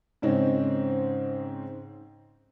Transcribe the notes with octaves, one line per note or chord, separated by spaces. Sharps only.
G#2 C#3 C4 C#4 D#4